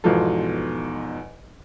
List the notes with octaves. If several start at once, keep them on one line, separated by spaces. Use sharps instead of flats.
E2 G#2 B2 F3 F4 A4